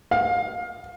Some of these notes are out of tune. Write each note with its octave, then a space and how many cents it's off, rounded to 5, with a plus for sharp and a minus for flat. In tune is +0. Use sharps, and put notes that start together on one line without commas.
F5 +25